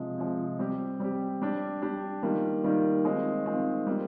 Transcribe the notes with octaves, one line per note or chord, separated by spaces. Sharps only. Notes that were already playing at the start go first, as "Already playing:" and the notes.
Already playing: C3 F3 G#3
C3 F3 G#3
G3 C4 G4
G3 C4 G4
G3 D4 G4
G3 D4 G4
D#3 G3 A#3 F4
D#3 G3 A#3 F4
D#3 G#3 C4 F4
D#3 G#3 C4 F4
G3 A#3 F4